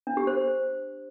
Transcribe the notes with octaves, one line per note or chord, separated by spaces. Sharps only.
D4
G4
C5